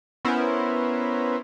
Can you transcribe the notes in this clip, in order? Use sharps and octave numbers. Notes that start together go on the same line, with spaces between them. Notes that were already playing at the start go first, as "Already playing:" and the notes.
B3 C#4 E4 A#4 C5